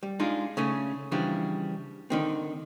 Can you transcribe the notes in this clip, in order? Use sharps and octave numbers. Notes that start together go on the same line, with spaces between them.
G3
G#3 D4 D#4 F4
C#3 A3 C#4
C#3 E3 F3 G3 D4
D3 D#3 C4